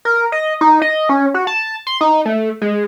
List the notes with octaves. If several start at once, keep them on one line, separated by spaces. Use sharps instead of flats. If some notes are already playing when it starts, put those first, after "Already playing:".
A#4
D#5
D#4
D#5
C#4
F#4
A5
C6
D#4
A3
G#3